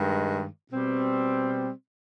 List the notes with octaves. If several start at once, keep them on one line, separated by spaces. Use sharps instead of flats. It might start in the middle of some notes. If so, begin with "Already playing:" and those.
Already playing: G2 D#3 G#3
B2 G3 C4